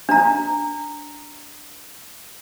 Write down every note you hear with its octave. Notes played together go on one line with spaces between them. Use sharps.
D4 A#5